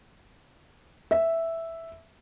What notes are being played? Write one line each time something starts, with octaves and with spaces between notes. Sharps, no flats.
E5